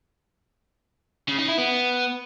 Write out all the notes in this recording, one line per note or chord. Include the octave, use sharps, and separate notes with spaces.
C#3
D#4
E4
B3